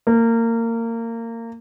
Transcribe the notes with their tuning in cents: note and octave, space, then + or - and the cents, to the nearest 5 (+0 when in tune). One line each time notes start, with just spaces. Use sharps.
A#3 -25